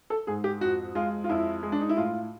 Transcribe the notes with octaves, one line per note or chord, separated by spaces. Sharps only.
A4
G#2 G#4
G4
F2 F#4
G#3 F4
F4
F2 E4
G#3
D4
D#4
E4
A2 F4